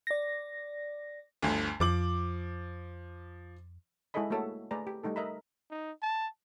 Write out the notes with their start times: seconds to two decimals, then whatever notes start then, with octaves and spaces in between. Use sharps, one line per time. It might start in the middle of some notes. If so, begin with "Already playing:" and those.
0.07 D5 A#6
1.42 G1 D2
1.80 F2 F3 D6 F#7
4.14 G#3 E4 G#4 A4 D#5 B5
4.30 A3 A#3 F#4 A4 C#5 E5
4.71 A3 G#4 B4 D5 A#5
4.87 G4
5.03 G3 A3 D#4 A4
5.16 A#4 D#5 E5 A#5 B5
5.71 D#4
6.02 A5